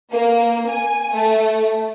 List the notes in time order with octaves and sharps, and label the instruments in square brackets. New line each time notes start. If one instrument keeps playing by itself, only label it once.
[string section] A#3
G#5
A3